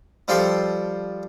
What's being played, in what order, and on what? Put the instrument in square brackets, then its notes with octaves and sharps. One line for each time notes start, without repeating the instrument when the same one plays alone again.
[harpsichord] F3 G3 A4 F5 G5 C6